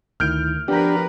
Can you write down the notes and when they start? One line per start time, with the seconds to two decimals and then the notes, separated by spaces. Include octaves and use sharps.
0.20 D2 D#3 E4 F6 G6 D7
0.68 F3 B3 D4 G4 A#4 B4